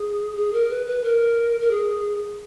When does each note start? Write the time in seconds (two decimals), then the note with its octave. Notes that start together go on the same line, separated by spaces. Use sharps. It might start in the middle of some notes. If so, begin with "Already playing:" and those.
Already playing: G#4
0.36 G#4
0.53 A#4
0.70 B4
0.86 B4
1.03 A#4
1.60 A#4
1.71 G#4